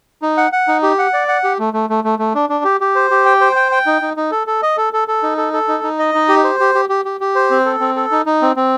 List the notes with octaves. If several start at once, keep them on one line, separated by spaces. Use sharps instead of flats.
D#4
F#5
F#5
D#4
G4
F#5
D5
F#5
G4
A3
A3
A3
A3
A3
D4
D4
G4
G4
C5
G4
G5
C5
G5
G5
D#4
D#4
D#4
A4
A4
D#5
A4
A4
A4
D#4
A4
A4
D#4
D#4
D#5
D#4
G4
C5
G4
G4
G4
G4
G4
C5
C4
A4
C4
A4
D#4
D#4
C4
C4